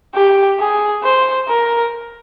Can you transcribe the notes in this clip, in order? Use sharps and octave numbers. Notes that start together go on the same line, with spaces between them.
G4
G#4
C5
A#4